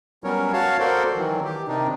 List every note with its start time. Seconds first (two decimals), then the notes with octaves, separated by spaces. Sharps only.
0.24 F#3 G3 B3 C#4 A#4 C#5
0.53 F#4 C#5 F5 A5
0.80 F#4 A4 A#4 C5 D5 C6
1.16 D#3 E3 F#3
1.45 G4
1.68 C3 D#3 D4 D#4